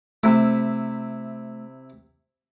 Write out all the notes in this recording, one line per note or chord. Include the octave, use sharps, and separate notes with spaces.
C3 A3 E4